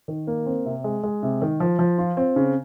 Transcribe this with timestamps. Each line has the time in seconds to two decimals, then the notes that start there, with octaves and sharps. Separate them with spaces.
0.08 D#3
0.27 A#3
0.46 C4
0.66 C3
0.84 G#3
1.03 G#3
1.23 C3
1.42 D#3
1.60 F3
1.79 F3
1.98 F4
2.17 C4
2.36 C#3